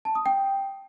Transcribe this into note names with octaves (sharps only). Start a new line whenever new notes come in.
A5
D#6
G5